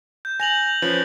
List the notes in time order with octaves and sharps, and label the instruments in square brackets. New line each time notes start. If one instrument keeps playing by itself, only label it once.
[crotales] G6
[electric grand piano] G#5 [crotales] A#6 F7 F#7
[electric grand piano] F3 C#4 B4